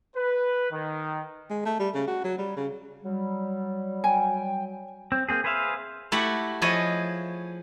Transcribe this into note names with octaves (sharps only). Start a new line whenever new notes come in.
B4
D#3
G#3
A3
G3
C#3
F#4
F#3
G3
C#3
F#3 G3
G5 G#5
C4
A#3 C4 G#4
G#4 B4 C5 E5 F5
A3 E4 F#4 G4 F#5
F3 E4 G#4 C#5 D#5